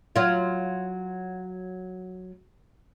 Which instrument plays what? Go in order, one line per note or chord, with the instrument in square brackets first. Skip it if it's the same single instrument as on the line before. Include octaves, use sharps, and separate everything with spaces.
[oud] F#3 F4